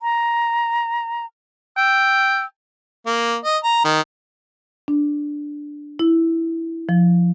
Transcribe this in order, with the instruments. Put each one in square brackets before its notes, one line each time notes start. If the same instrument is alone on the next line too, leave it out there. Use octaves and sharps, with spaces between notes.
[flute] A#5
[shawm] G5 [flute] E6
[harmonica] A#3
D#5
A#5
D#3
[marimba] D4
E4
F3